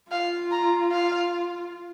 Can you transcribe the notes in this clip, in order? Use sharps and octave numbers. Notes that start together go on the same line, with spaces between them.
F4 F5
A#5
F5